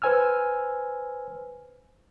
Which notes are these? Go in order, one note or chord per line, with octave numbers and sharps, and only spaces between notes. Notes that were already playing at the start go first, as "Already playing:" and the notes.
B4 C5 G#5 E6 F6